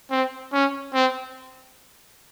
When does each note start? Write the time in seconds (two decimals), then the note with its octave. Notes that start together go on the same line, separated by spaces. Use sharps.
0.11 C4
0.53 C#4
0.94 C4